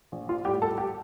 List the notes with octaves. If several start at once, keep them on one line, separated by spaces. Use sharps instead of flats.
A#1
F4
A2 G3 G4
A4
G4